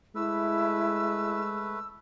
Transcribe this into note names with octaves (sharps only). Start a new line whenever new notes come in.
G#3 A3 E4 B4 E6